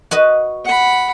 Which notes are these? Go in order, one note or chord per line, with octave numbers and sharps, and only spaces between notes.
F#4 B4 D#5
F#5 B5